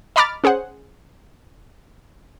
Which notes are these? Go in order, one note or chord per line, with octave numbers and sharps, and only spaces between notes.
D#5 A#5 B5 D6 F6 A6
C#4 G#4 C5 F#5